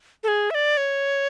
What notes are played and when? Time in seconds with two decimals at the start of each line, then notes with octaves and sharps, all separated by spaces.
0.24 A4
0.28 G#4
0.50 E5
0.55 D5
0.77 C#5